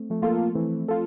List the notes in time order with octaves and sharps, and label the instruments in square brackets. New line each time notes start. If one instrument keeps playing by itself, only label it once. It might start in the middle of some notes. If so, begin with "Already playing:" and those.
Already playing: [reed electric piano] A3 C4
F3 A3
[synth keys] A#3 F4 A4
[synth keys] E3 [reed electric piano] A3 C4
[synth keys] F4 A4